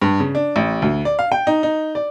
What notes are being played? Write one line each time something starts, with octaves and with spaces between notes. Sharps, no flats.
G2
C#3
D4
A1
D2
D5
F5
G5
D#4
D#4
D5